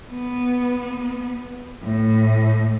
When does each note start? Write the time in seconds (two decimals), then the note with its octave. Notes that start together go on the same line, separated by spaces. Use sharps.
0.12 B3
1.83 A2